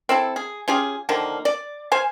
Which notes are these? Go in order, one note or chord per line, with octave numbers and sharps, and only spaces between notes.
C4 E4 A4
G#4
C#4 F4 G4 G#4
D3 D#3 F3 A#3
D5
C5 F5 G#5